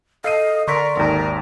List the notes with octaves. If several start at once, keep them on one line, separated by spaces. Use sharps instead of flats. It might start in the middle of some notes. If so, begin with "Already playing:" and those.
A4 D#5 F5 C7 D#7
D3 A#4 D5 C6 C#6 B6
G#1 D#2 A#4